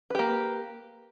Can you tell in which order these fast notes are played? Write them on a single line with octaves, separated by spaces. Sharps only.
B4 G4 A#3